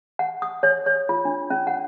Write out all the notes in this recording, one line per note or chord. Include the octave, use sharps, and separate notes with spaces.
F#5
D#6
C#5
C#5
F4
D4
C#4
F#5